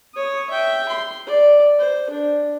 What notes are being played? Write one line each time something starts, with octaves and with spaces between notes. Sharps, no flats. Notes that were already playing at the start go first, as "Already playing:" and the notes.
C#5 D#6
E5 G5
C6
D5
C5
D4